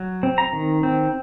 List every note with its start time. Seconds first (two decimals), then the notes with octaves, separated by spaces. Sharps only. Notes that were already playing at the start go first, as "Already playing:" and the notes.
Already playing: F#3
0.23 C4
0.38 A#5
0.53 D#3
0.83 C4